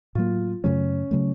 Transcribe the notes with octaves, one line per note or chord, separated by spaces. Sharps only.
A2 F#3 A#3 F4
F#2 C#3 F#3 A3 C#4
C#3 F#3 A3